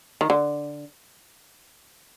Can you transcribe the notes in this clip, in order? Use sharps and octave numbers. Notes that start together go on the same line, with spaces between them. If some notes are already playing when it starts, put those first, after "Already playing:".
D#3
D3